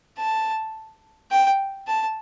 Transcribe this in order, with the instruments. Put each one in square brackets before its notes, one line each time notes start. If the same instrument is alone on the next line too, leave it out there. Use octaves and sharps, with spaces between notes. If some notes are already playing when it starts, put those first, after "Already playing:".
[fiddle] A5
G5
A5